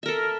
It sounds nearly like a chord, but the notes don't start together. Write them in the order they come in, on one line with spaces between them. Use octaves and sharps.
E5 A#4 A4